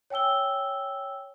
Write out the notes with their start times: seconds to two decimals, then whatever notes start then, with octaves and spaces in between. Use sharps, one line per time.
0.10 C#5 G5 G#5 E6 G7